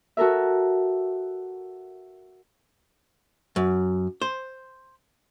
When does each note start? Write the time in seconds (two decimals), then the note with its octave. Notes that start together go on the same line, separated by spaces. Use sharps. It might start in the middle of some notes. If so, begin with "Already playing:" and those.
0.17 F#4 A4 A#4 E5
3.56 F#2
4.22 C5